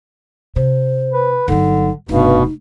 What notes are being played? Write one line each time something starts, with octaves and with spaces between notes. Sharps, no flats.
C3 C5
B4
G1 D3 F#3 D#4
F1 G2 B2 D#4